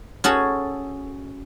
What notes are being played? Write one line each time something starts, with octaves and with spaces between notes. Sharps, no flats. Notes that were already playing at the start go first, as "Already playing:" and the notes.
C#4 F#4 G#4 A4